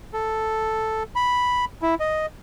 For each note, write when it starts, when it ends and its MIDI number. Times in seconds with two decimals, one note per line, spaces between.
0.14 1.03 69
1.16 1.65 83
1.82 1.95 64
2.00 2.26 75